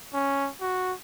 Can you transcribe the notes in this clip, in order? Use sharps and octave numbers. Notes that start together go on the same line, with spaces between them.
C#4
F#4